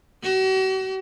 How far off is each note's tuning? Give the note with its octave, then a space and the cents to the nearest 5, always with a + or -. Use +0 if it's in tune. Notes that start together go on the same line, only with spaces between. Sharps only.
F#4 +45